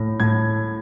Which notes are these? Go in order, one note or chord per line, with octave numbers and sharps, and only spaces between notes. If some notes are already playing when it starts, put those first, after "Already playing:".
Already playing: A2
A2 G#6